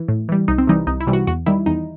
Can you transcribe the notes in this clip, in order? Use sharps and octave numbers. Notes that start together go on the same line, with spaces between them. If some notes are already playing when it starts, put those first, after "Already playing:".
Already playing: E3
A2
E3 G3
C2 D#4
C4
C3 E3 G3 D#4
C2 D#4
E4
C3 E3 G3
F#4
E2 F#4
D#3 G3 E4
E2 D#4